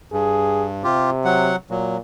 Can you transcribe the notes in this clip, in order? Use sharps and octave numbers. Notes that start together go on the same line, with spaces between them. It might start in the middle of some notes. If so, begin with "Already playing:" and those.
G2 G#4
C3 F4 G4
F#3 F#5
A#2 F#3